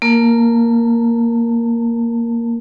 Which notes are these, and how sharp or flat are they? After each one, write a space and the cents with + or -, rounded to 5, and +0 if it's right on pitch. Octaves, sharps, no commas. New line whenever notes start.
A#3 -5 A#4 +0 A5 +15